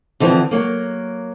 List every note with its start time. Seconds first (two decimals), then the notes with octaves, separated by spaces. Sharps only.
0.20 D3 E3 F3 C4
0.51 F#3 A#3